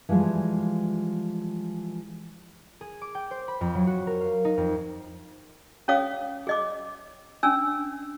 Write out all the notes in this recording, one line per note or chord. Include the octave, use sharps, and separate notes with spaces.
E3 F3 G3 G#3
G#4
D6
G5
C5
B5
F2
F#3
F#4
A#4
F5
D#4
F2
C#4 G#4 C#5 F5 D#6
G#4 D#5 D6
C#4 D4 G#5 E6